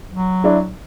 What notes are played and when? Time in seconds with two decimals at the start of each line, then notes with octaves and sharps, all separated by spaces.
0.10 F#3
0.44 D4 E4